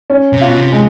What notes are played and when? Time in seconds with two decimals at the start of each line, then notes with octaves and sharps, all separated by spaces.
0.10 C#4
0.33 C3
0.41 F4
0.47 B2
0.57 C3
0.72 G#3